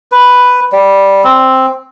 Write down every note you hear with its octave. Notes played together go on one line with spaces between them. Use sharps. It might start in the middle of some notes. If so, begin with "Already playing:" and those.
B4
G3
C4